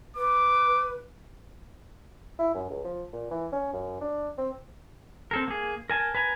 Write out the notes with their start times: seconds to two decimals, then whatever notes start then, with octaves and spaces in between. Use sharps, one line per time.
0.16 B4 D6
2.39 E4
2.55 F#2
2.70 C#2
2.84 F3
3.13 A#2
3.31 E3
3.52 C#4
3.74 F#2
4.01 D4
4.38 C4
5.31 C4 A4 A#4
5.48 A#3 G#4
5.90 A#4 G#5 A5
6.15 B4 G#5 A#5